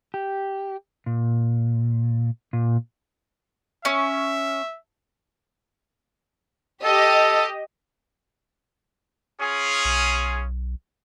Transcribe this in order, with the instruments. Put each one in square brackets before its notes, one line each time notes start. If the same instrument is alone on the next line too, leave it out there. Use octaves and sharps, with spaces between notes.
[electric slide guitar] G4
A#2
A#2
[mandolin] C#4 [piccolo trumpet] E5
[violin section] G4 D#5 [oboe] A4
[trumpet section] C#4 F4 G#4
[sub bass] B1